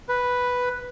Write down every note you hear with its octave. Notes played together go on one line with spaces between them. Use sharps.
B4